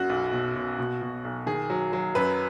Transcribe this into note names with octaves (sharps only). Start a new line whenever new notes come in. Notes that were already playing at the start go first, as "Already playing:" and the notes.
Already playing: F#2 F#4
B1
B2
B2
B2
B2
B1
D#3 G#4
F#3
F#3
F#2 B4